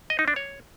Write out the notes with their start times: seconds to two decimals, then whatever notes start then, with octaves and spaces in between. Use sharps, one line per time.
0.10 D#5
0.19 D#4
0.28 D4
0.36 C#5